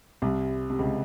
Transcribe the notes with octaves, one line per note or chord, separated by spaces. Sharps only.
C2 C3
C3
C#2 C#3